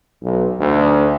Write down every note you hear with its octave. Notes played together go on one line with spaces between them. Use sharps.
B1
D2